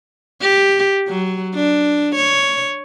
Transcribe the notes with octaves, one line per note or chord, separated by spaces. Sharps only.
G4
F#3
D4
C#5